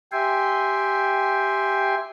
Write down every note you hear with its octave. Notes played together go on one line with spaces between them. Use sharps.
G4 E5 G5 G#5 C6